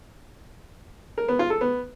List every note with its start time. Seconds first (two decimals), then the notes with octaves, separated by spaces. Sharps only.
1.18 A#4
1.28 B3
1.39 F4
1.50 A4
1.61 B3